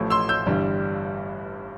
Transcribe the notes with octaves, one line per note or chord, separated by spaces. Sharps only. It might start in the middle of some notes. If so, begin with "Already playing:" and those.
Already playing: A1 A2 F3 A3
C6 E6
E6 G6
G1 G2 E3 G3